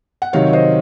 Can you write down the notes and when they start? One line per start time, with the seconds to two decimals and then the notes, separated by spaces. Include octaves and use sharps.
0.22 F#5
0.33 C3 D#3 F#3 C#5 F5
0.53 C5 D#5